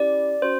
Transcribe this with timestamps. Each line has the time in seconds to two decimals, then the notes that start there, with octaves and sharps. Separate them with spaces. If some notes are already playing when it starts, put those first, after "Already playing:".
Already playing: C#4 E4 G4 D5
0.42 C#4 F#4 C5